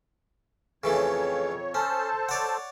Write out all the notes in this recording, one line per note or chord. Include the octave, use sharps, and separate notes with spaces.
F2 C#3 E3 A3 C#5
C#4 A4 C5 A5
C#5 D5 F#5